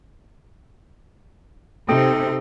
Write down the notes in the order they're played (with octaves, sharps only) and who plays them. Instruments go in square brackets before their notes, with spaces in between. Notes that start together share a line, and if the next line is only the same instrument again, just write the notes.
[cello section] C3 [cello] C4 D#4 [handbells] A4 G5 D#6